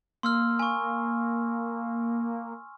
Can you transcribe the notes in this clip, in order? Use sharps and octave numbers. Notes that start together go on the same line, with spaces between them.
A#3 C6 E6 F6
G#5 C#6